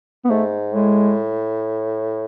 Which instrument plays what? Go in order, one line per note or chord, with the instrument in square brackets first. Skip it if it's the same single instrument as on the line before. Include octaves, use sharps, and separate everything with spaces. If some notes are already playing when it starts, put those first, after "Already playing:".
[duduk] B3
[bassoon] G#2 [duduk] A3
[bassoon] A2 [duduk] G#3